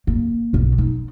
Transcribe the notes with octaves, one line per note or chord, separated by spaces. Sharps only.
A#3
B1 E4
D#4